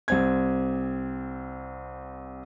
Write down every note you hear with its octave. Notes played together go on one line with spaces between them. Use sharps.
C2 C4 G#6